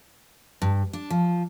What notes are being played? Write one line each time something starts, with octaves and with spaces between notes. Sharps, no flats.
G2
D4
F3